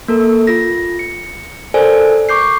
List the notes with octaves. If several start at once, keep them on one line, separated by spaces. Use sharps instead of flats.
A#3 A4 A#4
F4 A#6
C#7
A4 A#4 C5 D5 G#5
C#6 D6 G6 C7